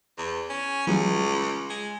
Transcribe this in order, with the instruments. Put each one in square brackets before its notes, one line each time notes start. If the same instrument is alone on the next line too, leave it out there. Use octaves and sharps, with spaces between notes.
[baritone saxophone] E2
C#4
[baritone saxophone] C#2 [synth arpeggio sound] E3 F#3 G3
[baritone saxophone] G#3